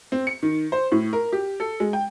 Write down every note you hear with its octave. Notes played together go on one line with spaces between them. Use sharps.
C4
C#7
D#3
C5
A2
A#4
G4
A4
G#3
G5